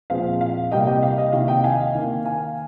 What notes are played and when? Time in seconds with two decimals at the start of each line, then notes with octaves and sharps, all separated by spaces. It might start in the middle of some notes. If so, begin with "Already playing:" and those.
0.10 A#2 F3 G#3 C4 F5
0.41 F5
0.71 C3 G3 A#3 D#5 G5
0.87 D#5 G5
1.03 F5
1.18 D#5
1.33 C3 D#3 A#3 F5
1.48 D#5 G5
1.64 F5 G#5
1.95 D#3 A#3
2.25 F5 G#5